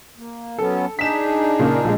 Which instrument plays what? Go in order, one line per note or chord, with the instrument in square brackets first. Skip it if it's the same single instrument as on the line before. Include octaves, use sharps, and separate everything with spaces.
[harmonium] A#3
[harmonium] F#3 B3 C#4 [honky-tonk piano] A4
[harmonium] D4 D#4 G#4 [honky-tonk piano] B6 E7
[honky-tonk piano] A#2 C#3 A#3
A#1 G#3